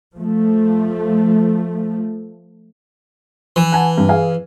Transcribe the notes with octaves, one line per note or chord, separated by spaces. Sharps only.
F3 A3
E3
F#5 G#5 A5
G2
G#4 F5 G#5